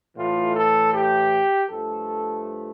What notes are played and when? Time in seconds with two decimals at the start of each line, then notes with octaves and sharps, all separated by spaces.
0.16 A2 E3 A3 F4
0.55 A4
0.93 G4
1.69 G2 F3 A3 A4